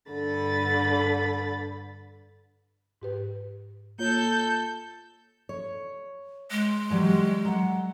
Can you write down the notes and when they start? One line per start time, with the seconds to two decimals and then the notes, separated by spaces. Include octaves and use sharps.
0.11 G2 D3 B5 A6
3.02 G#2 G4 B4
3.99 A#3 F4 A4 C#5 G6
5.49 C#5
6.51 G#3
6.90 E3 F#3 G3
7.45 F#3 F#5